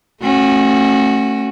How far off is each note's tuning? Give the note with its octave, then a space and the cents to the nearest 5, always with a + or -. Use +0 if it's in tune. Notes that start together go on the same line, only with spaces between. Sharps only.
A3 +0 C#4 -35 F#4 +0